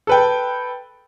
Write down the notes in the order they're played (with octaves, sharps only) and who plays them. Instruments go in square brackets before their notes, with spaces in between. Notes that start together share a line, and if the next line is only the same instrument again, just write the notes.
[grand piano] A4 B4 G5